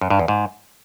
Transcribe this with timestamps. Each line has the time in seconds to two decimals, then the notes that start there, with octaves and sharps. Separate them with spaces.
0.01 F#2
0.10 G2
0.19 E2
0.28 G#2